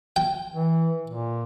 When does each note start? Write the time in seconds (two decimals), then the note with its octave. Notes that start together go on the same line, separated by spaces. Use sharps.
0.16 G5
0.54 E3
1.08 A#2